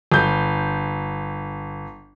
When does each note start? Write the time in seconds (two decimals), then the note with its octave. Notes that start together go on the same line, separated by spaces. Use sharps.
0.12 G1 G6